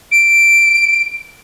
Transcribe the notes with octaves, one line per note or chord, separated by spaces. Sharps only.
D7